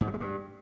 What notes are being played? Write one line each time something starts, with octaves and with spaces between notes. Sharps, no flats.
G#2
F#3
G#3
G2